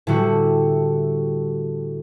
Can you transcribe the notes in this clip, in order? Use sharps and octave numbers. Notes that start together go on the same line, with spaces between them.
A2 D3 G3 E4 F#4